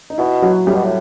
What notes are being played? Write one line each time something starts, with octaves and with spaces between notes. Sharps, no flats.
D#4
B2 E4
F#3 F#4
A2 G3 G4
B2
A2